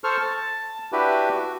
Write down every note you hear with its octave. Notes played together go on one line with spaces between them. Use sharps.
A4 C5 C#6 F6
A5
D4 E4 F#4 G4 B4
F#4